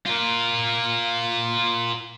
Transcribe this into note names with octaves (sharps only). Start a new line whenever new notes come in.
F4 A#4